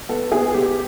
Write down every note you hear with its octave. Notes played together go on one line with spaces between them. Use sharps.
B3 A4
B3 G#4
B3 G4